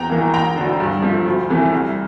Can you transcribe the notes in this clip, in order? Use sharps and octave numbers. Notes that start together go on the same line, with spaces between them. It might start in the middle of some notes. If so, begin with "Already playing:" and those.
Already playing: E2 G5 A#5
E3 A#3
E1 G5 A#5
D2 D3
G2
F3 A3
D2
C3 E3 A3
C2